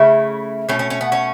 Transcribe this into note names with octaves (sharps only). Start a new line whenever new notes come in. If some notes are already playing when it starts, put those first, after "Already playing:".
Already playing: C#3 A3 E4
B2 A3 C#4
C#4
C#4
B3
C#4